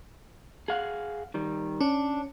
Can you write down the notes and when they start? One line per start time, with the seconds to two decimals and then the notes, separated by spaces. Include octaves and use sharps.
0.68 G#4 F5 F#5
1.34 D#3 G3
1.81 C#4 D4